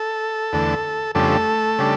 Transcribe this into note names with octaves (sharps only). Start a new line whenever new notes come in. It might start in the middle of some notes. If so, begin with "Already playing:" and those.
Already playing: A4
E2 D3 A3
F2 C#3 G3 A3 D4 A4
C#3 G3 D4